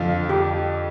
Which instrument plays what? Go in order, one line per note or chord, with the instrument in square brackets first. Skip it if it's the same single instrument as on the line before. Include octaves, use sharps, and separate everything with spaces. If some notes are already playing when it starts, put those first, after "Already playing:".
Already playing: [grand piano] F2 D3 F3 [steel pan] F4
[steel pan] G4